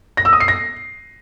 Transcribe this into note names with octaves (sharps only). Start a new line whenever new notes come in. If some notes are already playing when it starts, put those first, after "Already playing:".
A#6
E6
D#6
C7
A#6